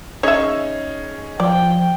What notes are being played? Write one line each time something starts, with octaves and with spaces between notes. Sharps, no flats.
C#4 D#4 G#4 C#5 E5
F3 D5 G5